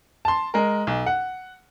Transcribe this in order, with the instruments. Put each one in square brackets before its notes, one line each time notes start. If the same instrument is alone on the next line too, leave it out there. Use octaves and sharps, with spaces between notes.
[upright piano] A5 C6
G#3 A#4
B1
F#5